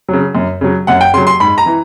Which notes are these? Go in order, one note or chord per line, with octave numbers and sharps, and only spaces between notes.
C#3 F#3
F#2
C#3 F#3
F#2 F#5
G5
C#3 F#3 C6
C6
G#2 B5
A#5
E3